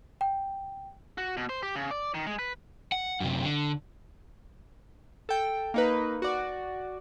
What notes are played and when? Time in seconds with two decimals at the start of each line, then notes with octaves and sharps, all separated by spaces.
0.21 G5
1.18 F#4
1.37 B2
1.49 C5
1.63 G4
1.76 C#3
1.91 D5
2.14 D#3
2.27 G#3
2.39 B4
2.92 F#5
3.20 F#2 C3
3.43 D3
5.29 A4 G5
5.74 A#3 D#4 B4
6.22 F#4 D5